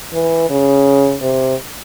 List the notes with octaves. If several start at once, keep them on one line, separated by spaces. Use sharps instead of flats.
E3
C#3
C3